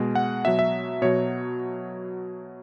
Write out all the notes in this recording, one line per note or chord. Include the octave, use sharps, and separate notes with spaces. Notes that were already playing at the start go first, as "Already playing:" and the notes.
Already playing: B2 G#3
F#5
B2 F#3 E5
E5
B2 F#3 C#5